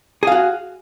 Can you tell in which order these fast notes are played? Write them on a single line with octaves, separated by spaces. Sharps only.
G#4 F5 F#4